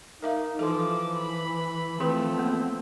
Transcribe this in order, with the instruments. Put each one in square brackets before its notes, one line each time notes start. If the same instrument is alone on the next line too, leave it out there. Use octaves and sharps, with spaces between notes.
[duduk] D#4 [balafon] A#4 E5 F5
[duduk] E3 [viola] F3 D6 [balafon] A4 C6
[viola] B5
[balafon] E3 G#4 B4 [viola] F3 A3 [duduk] C4
[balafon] A#3 B3